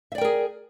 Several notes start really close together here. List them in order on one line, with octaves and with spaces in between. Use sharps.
E5 D5 G5 A#4 G#4